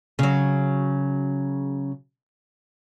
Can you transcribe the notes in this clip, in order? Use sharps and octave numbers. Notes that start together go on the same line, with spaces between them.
C#3 F#3